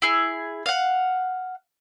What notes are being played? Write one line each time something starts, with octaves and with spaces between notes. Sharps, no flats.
E4 G#4
F5 F#5